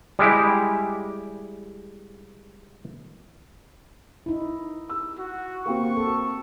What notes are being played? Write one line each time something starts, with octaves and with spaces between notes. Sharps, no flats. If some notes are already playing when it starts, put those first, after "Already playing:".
G3 G#3 E4 G4
D#4 E4
E6
F#4
A#3 C4 F#4 C#6
A4